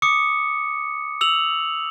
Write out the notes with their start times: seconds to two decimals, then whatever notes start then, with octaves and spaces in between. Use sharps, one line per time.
0.02 D6 D#6 C#7
1.21 E6 F7 F#7